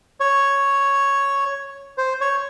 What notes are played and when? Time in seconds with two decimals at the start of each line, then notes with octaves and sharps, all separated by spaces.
0.20 C#5
1.98 C5
2.21 C#5